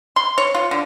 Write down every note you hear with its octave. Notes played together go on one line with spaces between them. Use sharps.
C6
C#5
F4
D3